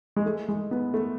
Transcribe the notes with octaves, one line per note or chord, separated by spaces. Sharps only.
G#3
A3
G#3
B3
A3